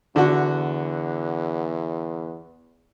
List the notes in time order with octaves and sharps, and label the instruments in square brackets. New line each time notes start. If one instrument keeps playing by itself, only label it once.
[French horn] E2 [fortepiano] D3 F#4